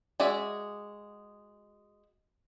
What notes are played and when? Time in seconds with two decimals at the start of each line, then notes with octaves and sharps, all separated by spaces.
0.20 G#3 F#4 G#4 D5 E5